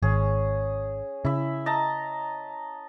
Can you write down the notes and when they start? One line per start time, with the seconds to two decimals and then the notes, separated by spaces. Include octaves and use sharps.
0.02 G#1 C#4 G#4
1.25 C#3 E4 E5
1.66 D#5 A5 A#5